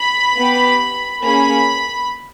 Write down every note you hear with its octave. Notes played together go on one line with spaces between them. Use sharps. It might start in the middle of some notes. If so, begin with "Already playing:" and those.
Already playing: B5
B3 G4
A#3 C#4 G#4 B5